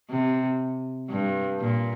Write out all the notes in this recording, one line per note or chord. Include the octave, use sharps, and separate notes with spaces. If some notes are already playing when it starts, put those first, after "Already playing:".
C3
G2
A#2